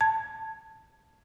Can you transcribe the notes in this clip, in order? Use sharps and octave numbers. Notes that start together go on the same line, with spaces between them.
A5 G#6